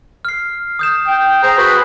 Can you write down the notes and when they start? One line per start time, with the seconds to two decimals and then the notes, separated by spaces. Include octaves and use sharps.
0.25 F6 C7
0.79 D#6 G6 E7
1.07 G5
1.43 G#4 C5 A#5
1.58 F#4 G#4 B4 B5